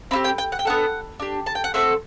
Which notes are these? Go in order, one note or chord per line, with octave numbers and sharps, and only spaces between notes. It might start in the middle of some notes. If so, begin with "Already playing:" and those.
C4 E4 G4 B5
G5
G5
F#5
G5
B3 D4 F#4 A4 F#5
D4 G4
A5
G5
F#5
A3 C4 F#4 A4 E5